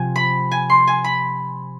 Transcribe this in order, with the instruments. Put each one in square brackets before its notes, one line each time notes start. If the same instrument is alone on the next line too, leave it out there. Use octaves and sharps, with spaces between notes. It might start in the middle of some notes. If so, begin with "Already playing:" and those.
Already playing: [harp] C3 F3 G#5
B5
G#5
C6
G#5
B5